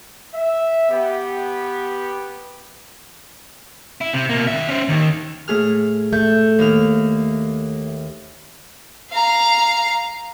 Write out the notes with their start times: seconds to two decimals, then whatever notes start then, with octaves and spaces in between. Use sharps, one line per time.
0.34 E5
0.89 B3 G4
4.01 E4
4.13 C3
4.29 B2 A#3
4.47 D#3 E5
4.68 C#4 C5
4.89 D#2 D#3
5.48 A2 G#4 F6
6.13 A3 G6
6.59 D#2 F6
9.11 F5 A#5